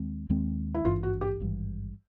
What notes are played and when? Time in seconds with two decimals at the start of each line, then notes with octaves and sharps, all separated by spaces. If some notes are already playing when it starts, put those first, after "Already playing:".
Already playing: D#2 D#3 G#3 C4
0.30 D#2 D#3 G#3 C4
0.74 E4
0.84 G#1 G2 E3 F4
1.03 F#4
1.21 G4
1.40 G#1 G2 E3